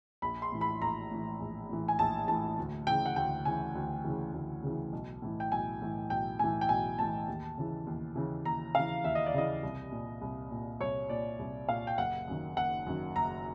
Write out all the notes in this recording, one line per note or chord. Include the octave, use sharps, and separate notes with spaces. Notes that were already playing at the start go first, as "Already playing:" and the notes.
A#1 B5
C6
A2 E3
B5
A#1 A#5
A2 E3
A#1
A2 E3
G#5
A#1 A5
A2 E3 A5
D2
C#3 E3 G5
F#5
D2 G5
C#3 E3 G#5
D2
C#3 E3
D2
C#3 E3
B1
A2 E3
G5
B1 G#5
A2 E3
B1 G5
A2 E3 G#5
G5
B1 G#5
A2 E3 A5
D#2
C#3 E3
D#2
C#3 E3
D#2 A#5
C#3 E3 F5
D#2 E5
D#5
D5
C#3 E3 D#5
C2
A#2
C2
A#2
C2 C#5
A#2 D5
C2
A#2 F5
G5
F#1 F#5
F#2 D#3
F#1 F#5
F#2 D#3
F#1 A#5